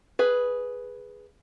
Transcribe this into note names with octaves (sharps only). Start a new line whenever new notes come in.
G#4 B4